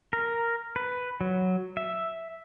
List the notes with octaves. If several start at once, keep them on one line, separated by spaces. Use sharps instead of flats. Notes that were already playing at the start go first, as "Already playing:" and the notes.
A#4
B4
F#3
E5